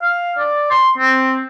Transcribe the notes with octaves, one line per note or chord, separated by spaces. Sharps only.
F5
D5
C6
C4